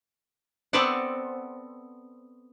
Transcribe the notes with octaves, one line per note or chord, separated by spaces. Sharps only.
B3 C4 A4 B4 D5 F#5